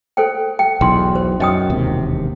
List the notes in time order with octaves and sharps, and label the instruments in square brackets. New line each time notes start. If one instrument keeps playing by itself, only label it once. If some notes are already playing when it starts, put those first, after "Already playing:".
[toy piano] A4 C5 G5
G5
[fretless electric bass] B1 E2 [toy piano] G5 C6
[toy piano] C5
[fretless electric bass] F#2 [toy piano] D#5 G5 D#6
[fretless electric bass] E1 D#2 C3